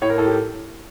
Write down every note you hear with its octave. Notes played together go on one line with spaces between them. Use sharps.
A2 C#5
A#4
A2 A4
G4